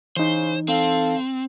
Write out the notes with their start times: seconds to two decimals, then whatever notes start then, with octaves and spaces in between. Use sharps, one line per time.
0.17 C#3 E3 D#4 C5
0.68 C4 A4 F5